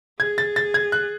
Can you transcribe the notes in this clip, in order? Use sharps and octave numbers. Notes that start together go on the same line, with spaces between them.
G#4 G#6
A6
A6
G#6
F#6